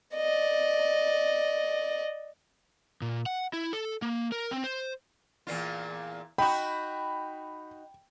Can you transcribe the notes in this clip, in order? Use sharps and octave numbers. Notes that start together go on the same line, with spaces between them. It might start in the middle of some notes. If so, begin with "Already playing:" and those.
D5 D#5
A#2
F#5
E4
A4
A#3
A#4
C4
C5
E2 A#2 F4
D#4 F#4 G5 B5